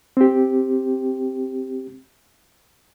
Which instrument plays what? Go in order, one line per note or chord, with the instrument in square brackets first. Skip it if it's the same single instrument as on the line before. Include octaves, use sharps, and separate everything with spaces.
[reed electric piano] C4 G4